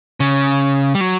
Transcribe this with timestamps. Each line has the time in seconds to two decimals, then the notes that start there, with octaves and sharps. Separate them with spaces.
0.20 C#3
0.95 G3
1.01 F#3